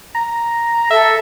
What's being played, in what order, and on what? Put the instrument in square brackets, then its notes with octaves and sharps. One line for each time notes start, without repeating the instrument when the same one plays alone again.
[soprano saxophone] A#5
[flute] A4 [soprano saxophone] E5